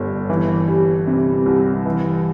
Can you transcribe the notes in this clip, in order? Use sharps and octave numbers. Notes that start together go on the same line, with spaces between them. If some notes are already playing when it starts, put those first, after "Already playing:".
Already playing: G1 G2
E3
G3
C3
C2
E3